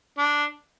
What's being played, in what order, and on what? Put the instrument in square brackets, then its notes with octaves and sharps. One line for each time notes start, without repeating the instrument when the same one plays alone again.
[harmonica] D4